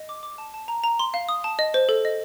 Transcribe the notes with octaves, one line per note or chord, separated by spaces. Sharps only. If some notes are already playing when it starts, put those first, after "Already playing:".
Already playing: D#5
D6
D6
A5
A5
A#5
A#5
C6
F5
D#6
A5
D#5
C5
A4
D#5